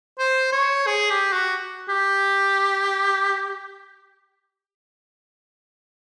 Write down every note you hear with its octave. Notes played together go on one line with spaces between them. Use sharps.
C5
C#5
G#4
G4
F#4
G4